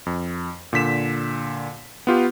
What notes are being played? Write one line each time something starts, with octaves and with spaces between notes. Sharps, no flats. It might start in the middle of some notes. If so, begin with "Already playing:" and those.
F2
A#2 D3 B6 E7
B3 F4 G4